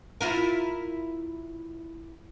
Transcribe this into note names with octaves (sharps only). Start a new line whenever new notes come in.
E4 F4 A#4